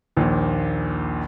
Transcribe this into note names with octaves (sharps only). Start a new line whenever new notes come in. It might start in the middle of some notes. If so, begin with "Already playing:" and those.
A#1 D#2 A#2